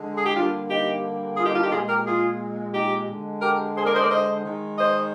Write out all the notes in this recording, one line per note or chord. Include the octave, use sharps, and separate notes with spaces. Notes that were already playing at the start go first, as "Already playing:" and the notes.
Already playing: D3 G#3
G#4
G4
D3 G3 A#3 D4 F4
D#4 G4
F4 G#4
D#4 G4
D4 F4
D#4 G4
A#2 G#3 F4 G#4
G4 A#4
F4 G#4
D#4 G4
D3 G#3
G4 A#4
G#4 C5
A#4 D5
C5 D#5
A#4 D5
C5 D#5
D#3 G#3
C5 D#5